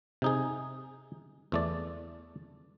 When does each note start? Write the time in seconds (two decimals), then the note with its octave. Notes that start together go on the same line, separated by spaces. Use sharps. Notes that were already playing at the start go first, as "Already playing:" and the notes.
0.22 C3 D#4 G#4
1.52 E2 A3 D5